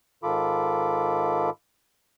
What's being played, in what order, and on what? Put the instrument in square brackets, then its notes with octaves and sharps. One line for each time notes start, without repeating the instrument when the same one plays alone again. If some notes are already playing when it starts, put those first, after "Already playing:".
[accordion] G#2 D#3 F4 A4 B5 D6